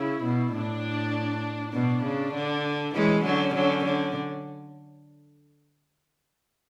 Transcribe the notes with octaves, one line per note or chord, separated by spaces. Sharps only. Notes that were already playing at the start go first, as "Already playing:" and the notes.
Already playing: C#3 E4
B2
A2 D4
B2 D4
C#3
D3
E3 G#3 C#4
D3 F#3
D3 F#3
D3